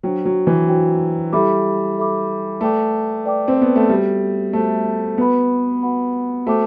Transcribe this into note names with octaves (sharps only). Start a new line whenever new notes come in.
F#3 D4 F#4 C5 G5
F#3
E3
D4 F#4 C5 G5
G3 E4 A4 E5 B5 D6
E4 A4 E5 B5 D6
A3 B4 D5 G5 D6
B4 D5 G5 D6
C4
B3
A3
G3 F#4 A4 C5 E5
A3 F#4 A4 C5 E5
B3 F#4 B4 F#5 B5
F#4 B4 F#5 B5
A3 F#4 C5 G5 D6